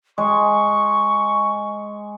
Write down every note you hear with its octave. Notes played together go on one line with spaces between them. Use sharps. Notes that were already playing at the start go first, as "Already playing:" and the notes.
G#3 C#6